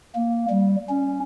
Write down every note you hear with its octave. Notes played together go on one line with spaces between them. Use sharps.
A#3
G3
C#4